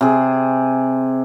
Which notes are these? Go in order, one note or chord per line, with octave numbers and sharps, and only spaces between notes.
C3 G#4